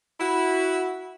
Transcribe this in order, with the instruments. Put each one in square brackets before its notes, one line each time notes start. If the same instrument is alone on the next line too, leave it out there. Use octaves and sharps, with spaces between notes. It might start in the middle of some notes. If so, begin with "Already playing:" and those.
[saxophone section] E4 F#4